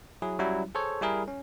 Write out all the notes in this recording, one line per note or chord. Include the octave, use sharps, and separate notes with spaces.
F#3 E4 G#4
F#3 G3 C#4 E4
G#4 A4 C5 C#5
G3 E4 G#4 A#4
C#4